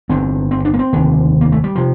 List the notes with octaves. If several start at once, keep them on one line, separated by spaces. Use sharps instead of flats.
G1 G2 D3 C4
C4
D4
A#3
C4
F1 D#2 D3
A#3
A3
G3
C3 F3